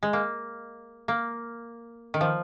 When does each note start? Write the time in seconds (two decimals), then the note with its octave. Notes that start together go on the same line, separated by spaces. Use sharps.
0.03 G#3
0.13 A#3
1.08 A#3
2.14 D#3
2.21 F3